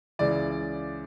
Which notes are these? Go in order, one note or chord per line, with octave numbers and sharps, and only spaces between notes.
C#2 C#3 E3 D5